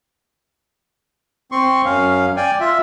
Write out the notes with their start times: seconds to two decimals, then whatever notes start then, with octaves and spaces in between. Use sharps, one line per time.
1.52 C4 C6 C#6
1.85 F#2 C#4 F5
2.37 D5 G5 G#5
2.60 F4 E5